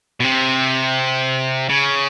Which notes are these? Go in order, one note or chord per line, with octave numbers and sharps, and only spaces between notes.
B2
C3
C#3